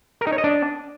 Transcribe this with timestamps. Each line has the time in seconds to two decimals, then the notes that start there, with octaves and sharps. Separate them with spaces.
0.21 A#4
0.27 D#4
0.32 C#5
0.38 D#5
0.44 D4